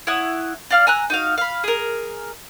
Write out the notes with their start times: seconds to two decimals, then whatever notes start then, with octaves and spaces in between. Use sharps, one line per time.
0.07 E4 C#5 F#5 D#6
0.71 D5 F5 F6
0.87 G#5 A#5 E6 F#6
1.10 D#4 F#4 F5
1.38 F5 B5
1.64 G#4 A#4